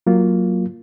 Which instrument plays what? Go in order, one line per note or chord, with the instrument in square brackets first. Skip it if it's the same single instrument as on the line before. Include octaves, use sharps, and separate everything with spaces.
[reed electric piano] F#3 A#3 F4